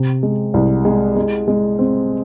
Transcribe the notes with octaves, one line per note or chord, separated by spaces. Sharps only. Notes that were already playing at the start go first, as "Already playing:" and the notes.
Already playing: C3
G#3
C2
G#3
G#3
G#3
C4